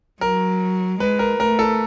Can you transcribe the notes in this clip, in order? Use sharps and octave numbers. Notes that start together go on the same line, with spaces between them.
F#3 A#4
G#3 B4
A#4
A3 A#4
A4